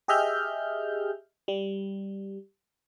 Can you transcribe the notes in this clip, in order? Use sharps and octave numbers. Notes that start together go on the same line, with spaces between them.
G4 G#4 D#5 E5 F6 G6
G3